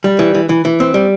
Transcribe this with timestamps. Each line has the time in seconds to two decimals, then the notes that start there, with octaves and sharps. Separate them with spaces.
0.04 G3
0.19 E3
0.35 E3
0.49 E3
0.65 E3
0.80 C4
0.94 G3